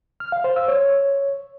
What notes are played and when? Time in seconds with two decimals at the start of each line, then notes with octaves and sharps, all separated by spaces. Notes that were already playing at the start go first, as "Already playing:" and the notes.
0.20 F6
0.32 F5
0.44 C5
0.56 E6
0.68 C#5